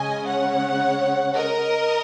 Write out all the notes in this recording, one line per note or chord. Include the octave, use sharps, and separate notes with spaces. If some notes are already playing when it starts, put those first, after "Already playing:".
Already playing: C#3 G#3 C#4 D#5 G#5
C#5 F#5
A#4 D#5